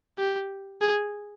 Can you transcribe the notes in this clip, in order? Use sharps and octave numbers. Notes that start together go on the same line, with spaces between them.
G4
G#4